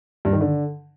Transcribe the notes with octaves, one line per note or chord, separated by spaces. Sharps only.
G2
D#3
D3